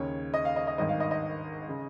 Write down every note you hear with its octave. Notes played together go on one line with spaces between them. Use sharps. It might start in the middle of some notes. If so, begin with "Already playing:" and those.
Already playing: D#2 C#3 C#5
D#5
F5
D#5
D#5
G#1 G2 D#3 D#5
F5
D#5
D#5
C#3